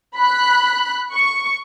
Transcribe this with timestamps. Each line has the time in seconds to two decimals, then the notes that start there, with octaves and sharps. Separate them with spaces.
0.17 B5 F#6
1.12 C#6